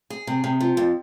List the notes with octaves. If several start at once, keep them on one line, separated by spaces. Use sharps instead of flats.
G#4
C3
C3
F3
F2